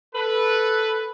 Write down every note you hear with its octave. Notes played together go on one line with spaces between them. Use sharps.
A4 B4